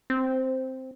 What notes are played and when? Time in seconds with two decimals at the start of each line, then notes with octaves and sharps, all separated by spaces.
0.10 C4